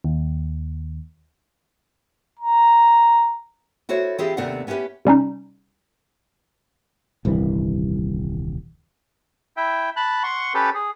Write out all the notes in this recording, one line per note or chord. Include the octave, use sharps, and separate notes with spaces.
D#2
A#5
E4 F#4 A4 C5 C#5
E3 C4 E4 F4 G4 G#4
D#2 C3 A3 B3 D4 F#5
B3 C#4 E4 G4 B4
C3 G3 C#4 D#4
D#1 C2 G2 E3
E4 E5 G5
A5 B5 F#6
F#5 C6 C#6
C#4 G4 A4 B4
G#4